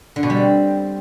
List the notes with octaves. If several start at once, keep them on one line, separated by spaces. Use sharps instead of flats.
D3
B2
G3
C4